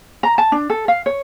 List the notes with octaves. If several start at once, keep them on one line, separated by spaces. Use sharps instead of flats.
A#5
A5
D4
A4
F5
C#5